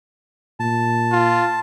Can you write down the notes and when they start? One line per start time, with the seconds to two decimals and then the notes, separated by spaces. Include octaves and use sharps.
0.60 A#2 A5
1.12 F4